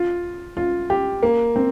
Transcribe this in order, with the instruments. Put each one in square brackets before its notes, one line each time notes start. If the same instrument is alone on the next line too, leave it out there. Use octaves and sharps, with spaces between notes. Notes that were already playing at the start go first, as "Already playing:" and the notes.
Already playing: [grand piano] F4
F4
G4
A#3
C4